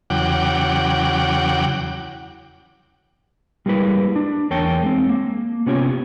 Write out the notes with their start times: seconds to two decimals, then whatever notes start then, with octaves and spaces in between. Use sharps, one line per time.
0.10 E2 C#3 F#3 F#5 G5 D6
3.66 G3 G#3 A#3 E4 B4
4.16 D4
4.50 E2 A#4 C#5 G5 A5
4.83 G#3 C4
5.09 A#3
5.66 C3 B3 C#4 F4 G4 C#5